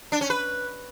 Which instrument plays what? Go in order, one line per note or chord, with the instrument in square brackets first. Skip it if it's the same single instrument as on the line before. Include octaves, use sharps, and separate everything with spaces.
[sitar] D4
C#4
B4